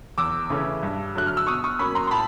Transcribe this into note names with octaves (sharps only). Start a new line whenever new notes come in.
E2 D6 E6
C#3 E3 A3 C#4
G2
D3 F#3 A3 F#6
F6
E6
B2 C#6 D#6
C#6 D#6
F#3 A#3 C#4 B5 C#6
A#5 C6
C6
A2 A5 B5